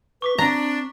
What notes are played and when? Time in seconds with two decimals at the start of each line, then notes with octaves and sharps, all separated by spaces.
0.22 B4 C#6 D6 B6
0.38 C4 D4 A#5